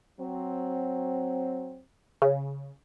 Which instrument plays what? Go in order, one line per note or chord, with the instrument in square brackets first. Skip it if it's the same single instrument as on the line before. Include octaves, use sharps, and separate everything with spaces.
[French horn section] F#3 C4
[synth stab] C#3